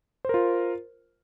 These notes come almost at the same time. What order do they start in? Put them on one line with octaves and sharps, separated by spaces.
C5 A#4 F4